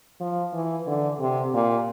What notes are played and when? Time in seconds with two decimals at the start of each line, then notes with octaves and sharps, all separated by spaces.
0.20 F3
0.53 E3
0.87 D3
1.20 C3
1.53 A#2